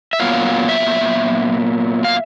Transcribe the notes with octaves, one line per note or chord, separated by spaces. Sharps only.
E5
A#2 F#3 B3 F5
E5
F5